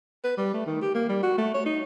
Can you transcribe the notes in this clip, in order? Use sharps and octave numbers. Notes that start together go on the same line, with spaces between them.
B4
G3
A3
D#3
G4
A#3
G3
F#4
A3
C#5
D#4